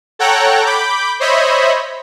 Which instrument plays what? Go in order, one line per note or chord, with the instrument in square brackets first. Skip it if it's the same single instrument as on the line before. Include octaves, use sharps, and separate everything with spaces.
[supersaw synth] A4 C#5 F#5 G5 A#5 F#6
B5 D6 G6
C5 C#5 D#5 E5 B5